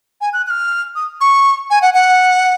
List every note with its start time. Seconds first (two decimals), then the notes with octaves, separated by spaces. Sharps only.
0.21 G#5
0.33 F#6
0.46 F#6
0.50 F6
0.95 D#6
1.21 C#6
1.70 G#5
1.82 F#5
1.94 F#5